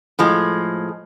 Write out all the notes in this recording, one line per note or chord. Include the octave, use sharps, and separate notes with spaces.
A2 F3 G#3